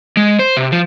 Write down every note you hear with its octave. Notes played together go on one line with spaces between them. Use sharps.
G#3
C5
C3
F3